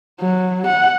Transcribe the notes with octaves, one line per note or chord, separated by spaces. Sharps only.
F#3
F#5